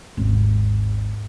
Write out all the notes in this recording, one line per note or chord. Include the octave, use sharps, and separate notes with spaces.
G#1 D#2